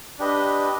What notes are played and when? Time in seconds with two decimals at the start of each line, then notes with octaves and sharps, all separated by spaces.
0.19 D4 G4 B4 D#5